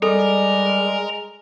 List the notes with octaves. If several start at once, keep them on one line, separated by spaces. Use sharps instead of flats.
G3 G#3 A4 A#4